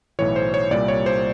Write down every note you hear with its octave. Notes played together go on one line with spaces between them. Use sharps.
B1 A2 E3 C#5
C5
C#5
C2 A#2 G3 D5
C#5
C5